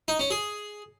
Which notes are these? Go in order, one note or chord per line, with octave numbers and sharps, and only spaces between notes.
D#4
C#4
G#4